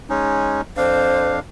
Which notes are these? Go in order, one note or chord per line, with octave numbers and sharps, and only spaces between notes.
G#3 C#4 D#4
F2 D4 C5 F5